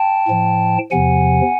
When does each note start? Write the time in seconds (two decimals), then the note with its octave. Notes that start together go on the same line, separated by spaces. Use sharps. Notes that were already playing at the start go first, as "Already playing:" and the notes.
Already playing: G5 A5
0.28 A2 F3
0.91 E2 C3 F3 F#5 G#5